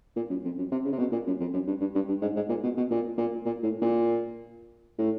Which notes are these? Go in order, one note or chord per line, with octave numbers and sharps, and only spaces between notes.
A#2
F#2
F2
F#2
C3
C#3
C3
B2
A#2
F#2
F2
F#2
G2
G2
G2
G2
G#2
G#2
A#2
B2
B2
A#2
A#2
A#2
A2
A#2
A2